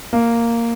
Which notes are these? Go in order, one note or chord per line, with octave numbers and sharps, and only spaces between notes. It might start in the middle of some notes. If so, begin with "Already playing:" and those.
A#3